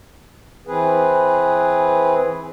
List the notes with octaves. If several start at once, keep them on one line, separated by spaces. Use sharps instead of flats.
E3 C4 G#4 B4